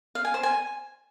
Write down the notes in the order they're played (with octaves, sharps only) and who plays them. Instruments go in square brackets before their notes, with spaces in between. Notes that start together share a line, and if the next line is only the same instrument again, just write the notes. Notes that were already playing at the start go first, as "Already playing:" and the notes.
[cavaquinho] F5
G#5
C5
G#5